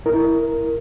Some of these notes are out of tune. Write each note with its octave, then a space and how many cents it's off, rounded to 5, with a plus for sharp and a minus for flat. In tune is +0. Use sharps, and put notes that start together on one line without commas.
E4 +0 A#4 +0